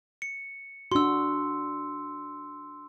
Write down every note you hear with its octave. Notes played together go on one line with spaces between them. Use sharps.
C#7
D4 F#4 C6 E6